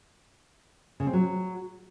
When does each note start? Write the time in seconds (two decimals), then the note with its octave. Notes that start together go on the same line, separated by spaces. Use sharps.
1.00 C#3
1.07 C4
1.13 F#3